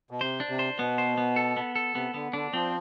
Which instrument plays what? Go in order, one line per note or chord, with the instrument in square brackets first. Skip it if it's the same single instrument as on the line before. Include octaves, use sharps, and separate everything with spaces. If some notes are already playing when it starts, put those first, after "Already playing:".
[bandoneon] B2
[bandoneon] C3 [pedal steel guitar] C5
[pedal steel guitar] D4
[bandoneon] C3
[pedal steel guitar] C5
[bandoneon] B2 [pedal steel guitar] B3
[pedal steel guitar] C5
B3
A4
B3
A4
[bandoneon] C3 [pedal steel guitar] B3
[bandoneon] D3 [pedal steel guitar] B3
[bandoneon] D3 [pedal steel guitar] D4
[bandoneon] F3 [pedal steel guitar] C4